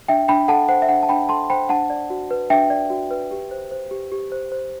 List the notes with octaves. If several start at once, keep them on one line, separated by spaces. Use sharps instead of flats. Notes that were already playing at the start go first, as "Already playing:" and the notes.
D4 E5 G5
D4 G5 B5
A4 F#5 A5
C5 F#5
E5
D4 F#5
A5
D4 G5 B5
A4 A5 C6
C5 G5 B5
D4 F#5 A5
D5
F#4
B4
D4 E5 G5
D5
F#4
B4
G4
C5
C5
G4
G4
C5
C5